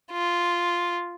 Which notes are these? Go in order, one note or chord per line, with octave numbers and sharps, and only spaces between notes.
F4